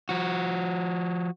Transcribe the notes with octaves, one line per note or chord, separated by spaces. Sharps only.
F3 F#4